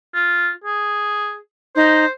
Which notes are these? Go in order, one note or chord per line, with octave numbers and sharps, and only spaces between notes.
F4
G#4
D#4 C5